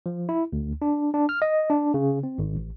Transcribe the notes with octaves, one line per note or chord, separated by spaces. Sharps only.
F3
E4
D2
D4
D4
F6
D#5
D4
C#3
C4
G#1
A1